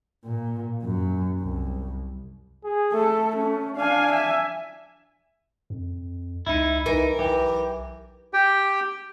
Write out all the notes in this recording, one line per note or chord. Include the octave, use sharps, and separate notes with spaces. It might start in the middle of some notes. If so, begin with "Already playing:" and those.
A#2
F#2
C2
G#4
A3 A4
C#4
D4 F5 G#5
E5 G#5
F2
C#2 D#4 E4
C2 E3 D#4 A#4
B1 E3 G4
G4 G5